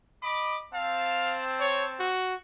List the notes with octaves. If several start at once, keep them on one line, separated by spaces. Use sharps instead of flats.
D#5 B5 D6
C4 F5 A5
C#5
F#4